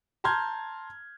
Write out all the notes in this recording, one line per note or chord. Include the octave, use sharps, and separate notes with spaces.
A5 A#5 C6 F6 G6 G#6